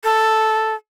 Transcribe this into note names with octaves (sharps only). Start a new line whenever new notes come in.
A4